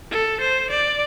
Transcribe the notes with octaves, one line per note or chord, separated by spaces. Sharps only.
A4
C5
D5